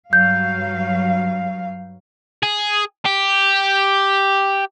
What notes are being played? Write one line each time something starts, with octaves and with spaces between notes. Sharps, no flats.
G2 F#3 F5 G6
G#4
G4